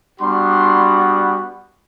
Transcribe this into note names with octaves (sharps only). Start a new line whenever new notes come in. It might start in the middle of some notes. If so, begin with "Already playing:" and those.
G3 B3 D4 F#4 C6